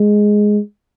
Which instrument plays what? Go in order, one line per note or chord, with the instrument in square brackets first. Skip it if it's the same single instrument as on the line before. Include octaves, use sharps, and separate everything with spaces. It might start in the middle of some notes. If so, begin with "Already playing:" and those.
Already playing: [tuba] G#3